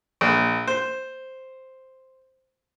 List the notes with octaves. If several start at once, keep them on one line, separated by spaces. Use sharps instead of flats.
A#1
C5